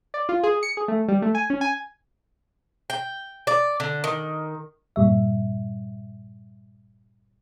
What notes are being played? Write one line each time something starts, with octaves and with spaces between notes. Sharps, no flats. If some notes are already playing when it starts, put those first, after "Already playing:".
D5
F4
G#4
C#7
G#4
A3
G3
A3
G#5
C#4
G#5
G5
D5
D3
D#3
G2 A#2 G3 E5